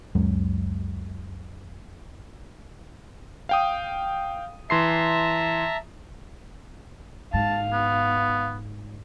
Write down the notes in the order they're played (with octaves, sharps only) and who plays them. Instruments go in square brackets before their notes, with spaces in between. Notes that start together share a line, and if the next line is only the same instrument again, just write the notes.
[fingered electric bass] C#2 F#2 F#3 G#3
[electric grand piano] F5 G5 D#6
[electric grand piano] E3 C6 C7 [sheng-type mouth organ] E5 A5 A#5
[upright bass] G#2 [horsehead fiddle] F5 [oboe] A5
[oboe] B3